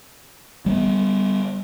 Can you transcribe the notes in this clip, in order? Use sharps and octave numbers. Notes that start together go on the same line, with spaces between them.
G3 G#3 B3